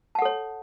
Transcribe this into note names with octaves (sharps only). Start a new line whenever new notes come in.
A4 C#5 F#5 A5